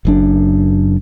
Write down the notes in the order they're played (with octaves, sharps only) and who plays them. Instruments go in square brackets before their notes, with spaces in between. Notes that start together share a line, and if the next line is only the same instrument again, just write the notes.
[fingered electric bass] F#1 F#2 D4